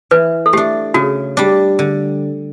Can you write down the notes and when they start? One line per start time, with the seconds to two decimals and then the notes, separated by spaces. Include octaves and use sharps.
0.11 E3 B4
0.46 A4
0.53 A3 D4 G4
0.94 C#3 F#4
1.37 G3 D4
1.79 D3